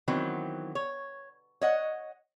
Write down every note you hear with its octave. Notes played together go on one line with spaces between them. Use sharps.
D#3 E3 F#3 B3 C4
C#5
C#5 D#5 F#5